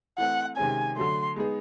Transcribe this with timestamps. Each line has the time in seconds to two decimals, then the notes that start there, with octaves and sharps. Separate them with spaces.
0.18 E3 A3 C4 F#5
0.57 C3 D#3 G#3 C#4 G#5
0.96 D3 F#3 A3 C6
1.36 G#3 B3 D#4 G#4